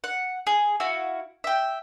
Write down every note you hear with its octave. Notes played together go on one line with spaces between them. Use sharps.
F#5
G#4
E4 F#4 F5
E5 G5